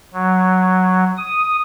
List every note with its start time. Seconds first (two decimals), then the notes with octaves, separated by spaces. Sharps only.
0.14 F#3
1.17 D#6